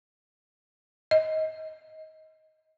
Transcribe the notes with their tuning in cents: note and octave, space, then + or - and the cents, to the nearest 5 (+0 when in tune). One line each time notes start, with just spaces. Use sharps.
D#5 +20